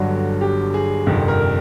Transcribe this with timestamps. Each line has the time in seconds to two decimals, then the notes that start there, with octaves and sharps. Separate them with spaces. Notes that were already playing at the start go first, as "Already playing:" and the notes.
Already playing: G1 G2 D3 F#3 F#4
0.41 G4
0.74 G#4
1.07 G1 F2 C3 D#3
1.28 A#4